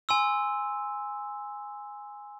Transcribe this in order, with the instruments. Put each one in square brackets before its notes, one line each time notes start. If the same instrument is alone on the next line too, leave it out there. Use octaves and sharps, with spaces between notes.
[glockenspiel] G#5 C6 E6